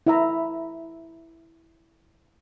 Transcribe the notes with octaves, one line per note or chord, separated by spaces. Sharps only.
E4 E5 A#5